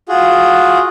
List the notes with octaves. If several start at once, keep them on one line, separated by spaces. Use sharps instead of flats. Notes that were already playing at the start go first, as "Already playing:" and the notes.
F4 F#4 G#4